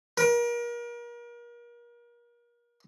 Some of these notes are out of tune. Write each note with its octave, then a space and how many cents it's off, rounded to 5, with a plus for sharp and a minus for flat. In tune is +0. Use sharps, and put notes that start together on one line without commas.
A#4 +35